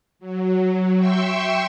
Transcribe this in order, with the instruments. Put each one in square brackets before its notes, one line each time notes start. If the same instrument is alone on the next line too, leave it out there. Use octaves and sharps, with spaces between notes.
[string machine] F#3
E5 G5 C6 C#6 E6